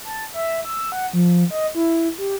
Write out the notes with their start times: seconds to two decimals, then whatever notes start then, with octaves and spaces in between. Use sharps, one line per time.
0.04 A5
0.33 E5
0.65 E6
0.92 F#5
1.13 F3
1.50 D#5
1.75 E4
2.18 G4